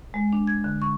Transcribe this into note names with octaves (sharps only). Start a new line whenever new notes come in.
G#3
D4
G#6
D3
C#6